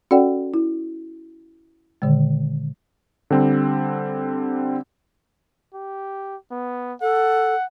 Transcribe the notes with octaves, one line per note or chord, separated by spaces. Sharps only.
C#4 F#4 A4 D5 F#5 G5
E4
A#2 D3 D#3 G#3
D3 G3 C4
G4
B3
A4 F#5